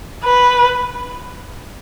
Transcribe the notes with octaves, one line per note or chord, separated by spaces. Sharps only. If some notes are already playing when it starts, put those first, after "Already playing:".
B4